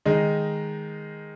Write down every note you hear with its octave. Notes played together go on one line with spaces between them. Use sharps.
D#3 G#3 D#4